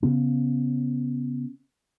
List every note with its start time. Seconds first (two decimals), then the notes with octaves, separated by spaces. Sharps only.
0.03 C#3 B3 C#4